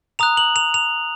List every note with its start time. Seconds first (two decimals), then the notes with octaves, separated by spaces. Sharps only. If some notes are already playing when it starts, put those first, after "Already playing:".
0.19 A#5 D#6 F#6 F7
0.37 F#7
0.56 F7
0.74 F7